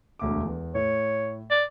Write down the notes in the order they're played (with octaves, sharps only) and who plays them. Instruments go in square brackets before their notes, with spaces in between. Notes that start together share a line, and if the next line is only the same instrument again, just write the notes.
[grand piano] E1 D2 D6
E2
[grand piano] A2 [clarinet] C#5
[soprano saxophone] D5